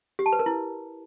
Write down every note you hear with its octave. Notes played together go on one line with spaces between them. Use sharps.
G4
A5
B4
A#4
E4